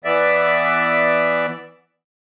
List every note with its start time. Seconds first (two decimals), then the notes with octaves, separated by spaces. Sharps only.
0.04 E3 B3 D5 E5